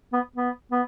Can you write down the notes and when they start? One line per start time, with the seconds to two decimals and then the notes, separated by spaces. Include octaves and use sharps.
0.13 B3
0.36 B3
0.72 B3